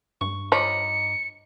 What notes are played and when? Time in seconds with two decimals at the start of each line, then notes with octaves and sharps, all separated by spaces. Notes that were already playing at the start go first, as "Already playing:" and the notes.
0.21 G2 C#6
0.52 F3 D#4 C#5 B5 D6 C#7